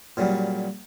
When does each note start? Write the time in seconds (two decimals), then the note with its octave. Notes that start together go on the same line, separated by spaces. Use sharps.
0.17 A#2 C#3 F#3 G3